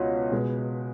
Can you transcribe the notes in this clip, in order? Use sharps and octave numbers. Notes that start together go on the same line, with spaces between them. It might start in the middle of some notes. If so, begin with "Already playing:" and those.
Already playing: C#2 B2 C#4 D#5 F#5
B2 G#3 B4